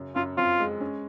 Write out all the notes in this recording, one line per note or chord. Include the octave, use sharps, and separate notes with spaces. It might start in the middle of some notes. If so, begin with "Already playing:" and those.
Already playing: F#2 C#3
F#2 F4
F2 F4
G#3
C#4